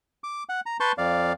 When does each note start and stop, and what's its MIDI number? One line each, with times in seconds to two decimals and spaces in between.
0.24 0.43 86
0.49 0.60 78
0.66 0.77 82
0.80 0.92 71
0.80 0.92 81
0.80 0.92 84
0.80 0.92 85
0.80 0.92 91
0.98 1.33 41
0.98 1.33 74
0.98 1.33 77